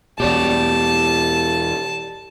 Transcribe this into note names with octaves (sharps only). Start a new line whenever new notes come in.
E2 B2 G4 C#5 D5 A5